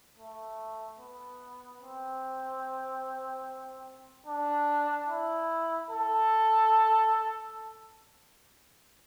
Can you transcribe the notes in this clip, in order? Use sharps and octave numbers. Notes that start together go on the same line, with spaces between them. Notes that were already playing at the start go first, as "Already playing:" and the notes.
A3
B3
C4
D4
E4
A4